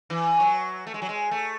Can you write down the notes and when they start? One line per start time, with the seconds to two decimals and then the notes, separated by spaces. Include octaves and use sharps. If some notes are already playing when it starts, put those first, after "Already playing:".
0.10 E3
0.40 F#3
0.87 A3
0.94 G#3
1.02 F#3
1.09 G#3
1.31 A3